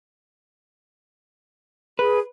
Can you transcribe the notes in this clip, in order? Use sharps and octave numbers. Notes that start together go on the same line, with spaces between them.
G#4 B4